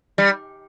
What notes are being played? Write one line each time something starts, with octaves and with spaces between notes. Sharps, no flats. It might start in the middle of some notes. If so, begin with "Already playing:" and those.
G3